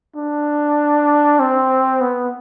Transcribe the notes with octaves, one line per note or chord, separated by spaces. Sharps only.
D4
C4
B3